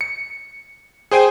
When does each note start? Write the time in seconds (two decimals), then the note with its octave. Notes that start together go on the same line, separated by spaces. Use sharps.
0.01 C#7
1.11 G#4 C5 G5 G#5